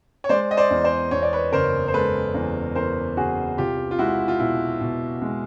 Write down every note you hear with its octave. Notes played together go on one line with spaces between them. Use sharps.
C#5
G#3 C5 D5
D#5
C5 D5
E2
C5 D5
E2 C#5
D5
B4 C#5
F#1 A#4 C5
C5
G#3 A4 B4
E2
E2 A#4 C5
F#1 F#4 G#4
C2 F4 G4
F4
G#3 E4 F#4
F4
B2 E4
B2
G#3